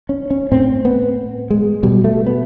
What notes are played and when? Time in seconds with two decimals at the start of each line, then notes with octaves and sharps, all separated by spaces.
0.09 C#4
0.31 C#4
0.52 A2 C4
0.85 B3
1.50 G#3
1.83 B2 G3
2.04 A3
2.27 B3